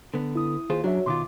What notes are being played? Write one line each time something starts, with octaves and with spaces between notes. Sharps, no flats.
D3 B3
E4 D#6
D#2 F4 G#4 C5
F#2 F#3 D4 F#4 C#5 E5
B2 D#3 F4 C6 D6